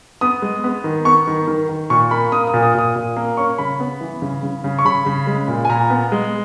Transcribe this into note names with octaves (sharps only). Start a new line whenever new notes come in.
B3 D#6
G#3
B3
D#3
B3 C#6
D#3
D#3
D#3
A#2 C#6
A#3 B5
A#3 D#6
D#6
A#2
D#6
A#2 D#6
A#2
A#3
C#4 C#6
C#3 B5
B3
E3
C#3
C#3
C#3
C#6
C#3 B5
C#3
G#3
A#2
G#5
A#2 A#5
B3
G#3